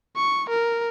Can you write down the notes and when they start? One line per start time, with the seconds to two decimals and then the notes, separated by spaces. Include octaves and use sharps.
0.16 C#6
0.50 A#4